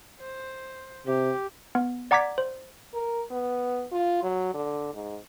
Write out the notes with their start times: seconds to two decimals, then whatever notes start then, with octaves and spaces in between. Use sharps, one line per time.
0.21 C5
1.07 C3 G4
1.75 B3
2.11 D5 F#5 A#5 D6 G#6 B6
2.38 C5
2.94 A#4
3.31 B3
3.92 F4
4.22 F#3
4.54 D3
4.94 G#2